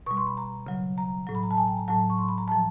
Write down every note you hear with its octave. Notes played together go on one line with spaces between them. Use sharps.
B2 G3 C#6
C6
B5
A#5
C#3 F#3
A#5
A2 F#3
B5
A#5
A5
G#5
G5
A#5
A2 F#3 A5
C#6
C6
B5
A#5
A2 F3 A5